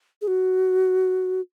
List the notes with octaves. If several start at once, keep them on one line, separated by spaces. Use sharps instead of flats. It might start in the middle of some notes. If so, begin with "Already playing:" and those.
G#4
F#4